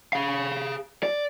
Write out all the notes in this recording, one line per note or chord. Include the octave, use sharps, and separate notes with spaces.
G#4 F5
D5